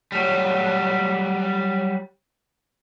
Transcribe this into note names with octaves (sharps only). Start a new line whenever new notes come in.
F#3 G3